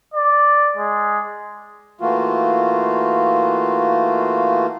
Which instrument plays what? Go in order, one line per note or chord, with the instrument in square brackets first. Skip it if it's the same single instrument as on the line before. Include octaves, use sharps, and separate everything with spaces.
[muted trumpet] D5
G#3
[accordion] E3 A3 A#3 F4 F#4